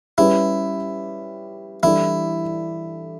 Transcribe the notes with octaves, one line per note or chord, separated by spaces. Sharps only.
G3 C#4 E4 G4 B4
E3 G3 D4 E4 A4 D5